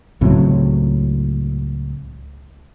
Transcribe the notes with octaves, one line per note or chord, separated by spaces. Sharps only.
C#2 A2 F#3 C4